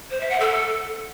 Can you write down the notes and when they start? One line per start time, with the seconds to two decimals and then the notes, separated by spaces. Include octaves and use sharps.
0.11 C5
0.21 E5
0.30 F#5
0.40 A4